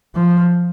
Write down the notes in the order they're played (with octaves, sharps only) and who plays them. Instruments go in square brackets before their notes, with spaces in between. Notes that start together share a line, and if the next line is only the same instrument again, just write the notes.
[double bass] F3